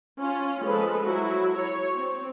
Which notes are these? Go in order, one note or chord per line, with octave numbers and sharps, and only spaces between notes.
C#4 F4
F3 G#3 A4 B4
F#3 E4 F#4
C#5
C4